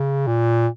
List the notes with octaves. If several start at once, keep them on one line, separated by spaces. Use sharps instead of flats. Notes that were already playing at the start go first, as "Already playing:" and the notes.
Already playing: C#3
A#2